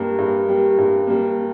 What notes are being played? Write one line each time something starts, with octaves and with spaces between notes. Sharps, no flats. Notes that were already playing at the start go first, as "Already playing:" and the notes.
Already playing: G2 G3 A#3
G2
G3 A#3
G2
G3 A#3